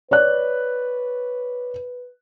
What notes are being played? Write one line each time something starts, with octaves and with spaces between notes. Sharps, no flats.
B4 C#5 D5 F#6